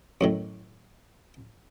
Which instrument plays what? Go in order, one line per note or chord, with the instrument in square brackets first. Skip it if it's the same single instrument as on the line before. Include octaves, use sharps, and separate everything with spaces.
[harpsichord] F#2 A2 D#3